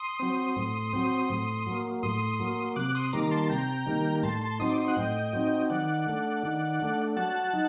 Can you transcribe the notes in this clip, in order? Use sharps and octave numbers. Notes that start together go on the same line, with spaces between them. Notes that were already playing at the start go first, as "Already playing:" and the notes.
Already playing: C6 D#6
F#3 C4
A2
F#3 C4
A2
F#3 A#3
A2 C6 D#6
F#3 A#3
C3 D6 F#6
C6 D#6
D#3 G3 A#3 A#5 D6
A#5
A5 C6
C3 G5 A#5
D#3 G3 A#3
A2 A5 C6
A5 C6
F#3 C4 D#4 C6 D#6
D6
C6 D#6
F#5
A2 D#5 G5
F#3 C4 D#4
D#3 D5 F#5
A3 D4
D#3
A3 D4
F#3 F#5 A5
D#4